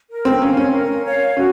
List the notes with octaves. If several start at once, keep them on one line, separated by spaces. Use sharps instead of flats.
A#4
C4
C#4 C#5 F5
C#4
A#4
C#5 F5
C#4 F#4